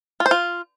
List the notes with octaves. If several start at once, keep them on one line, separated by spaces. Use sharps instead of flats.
F4
C5
F4